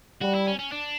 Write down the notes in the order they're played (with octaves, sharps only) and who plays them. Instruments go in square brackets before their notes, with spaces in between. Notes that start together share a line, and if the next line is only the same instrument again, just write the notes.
[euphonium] G3 [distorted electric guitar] F#4
[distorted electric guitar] E4
C#4
C#4
D4